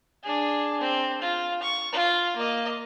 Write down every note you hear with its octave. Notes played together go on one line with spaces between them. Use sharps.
D4 G#4
C4
F4
C#6
F4
A#3 D#5